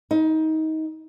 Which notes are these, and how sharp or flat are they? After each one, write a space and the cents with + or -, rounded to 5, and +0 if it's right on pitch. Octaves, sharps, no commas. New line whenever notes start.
D#4 +25